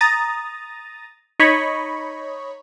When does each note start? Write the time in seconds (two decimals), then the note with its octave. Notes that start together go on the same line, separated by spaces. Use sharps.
0.01 A#5 D#6 A6
1.39 D#4 C#5 D#5 B5 C#6